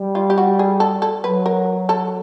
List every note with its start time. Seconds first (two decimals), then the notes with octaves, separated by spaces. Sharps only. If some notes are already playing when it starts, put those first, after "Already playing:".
Already playing: G3
0.15 F4
0.30 G4
0.38 F#4
0.59 G#4
0.80 A4
1.02 A4
1.24 F#3 B4
1.46 A#4
1.89 A4